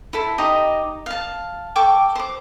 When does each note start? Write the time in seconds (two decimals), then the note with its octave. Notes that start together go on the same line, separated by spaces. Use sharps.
0.13 E4 A4 C6
0.38 D#4 G4 D#5
1.06 F5 A5
1.76 A4 G5 C#6 D6
2.15 C5 D6